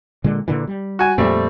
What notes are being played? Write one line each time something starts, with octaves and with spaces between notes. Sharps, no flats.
A#2 D3 G#3
A#2 D3 E3
G3
F#4 G#5
F2 A#2 G3 A3 C4